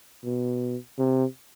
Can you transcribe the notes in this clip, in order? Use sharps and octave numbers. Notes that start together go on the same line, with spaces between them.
B2
C3